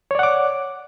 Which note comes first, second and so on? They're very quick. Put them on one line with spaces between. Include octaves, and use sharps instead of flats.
C#5 D5 F#5 D6